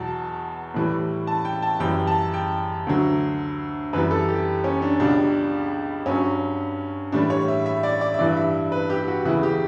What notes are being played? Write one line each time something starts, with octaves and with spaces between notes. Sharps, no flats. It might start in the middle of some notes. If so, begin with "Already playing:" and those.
Already playing: E2 B2 F#3 A5
A2 E3 G3
A5
G5
A5
F#2 E3 G3 G5
A5
G5
D2 D3 F#3
F#2 E3 G3 B4
A4
G4
C#4
D4
C#2 B2 G3 D4
G2 F#3 C#4
A2 E3 G3 D4
C#5
E5
E5
D5
D5
E5
G2 E3 G3 D5
E5
B4
G4
G4
F#4
E2 C#3 E3 E4
G4